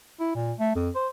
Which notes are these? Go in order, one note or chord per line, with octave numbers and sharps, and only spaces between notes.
E4
A#2
A3
F2
C5